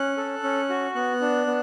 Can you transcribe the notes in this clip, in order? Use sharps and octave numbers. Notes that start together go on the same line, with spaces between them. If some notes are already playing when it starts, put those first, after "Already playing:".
Already playing: C#4 F#6
A4
C#4
F#4
B3 F#6
D4
B3